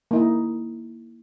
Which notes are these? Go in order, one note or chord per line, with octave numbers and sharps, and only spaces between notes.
A#3 D#4 E4